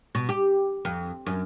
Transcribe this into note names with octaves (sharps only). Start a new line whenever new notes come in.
B2
G4
F2
F#2